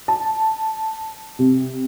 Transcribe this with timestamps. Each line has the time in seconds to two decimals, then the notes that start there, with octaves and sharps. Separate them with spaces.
0.08 A5
1.39 C3